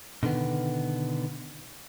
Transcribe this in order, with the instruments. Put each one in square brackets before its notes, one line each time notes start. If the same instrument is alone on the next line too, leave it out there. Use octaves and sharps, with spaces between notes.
[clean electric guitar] B2 D3 D#3 B3